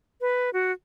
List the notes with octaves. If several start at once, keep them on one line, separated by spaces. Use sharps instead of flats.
B4
F#4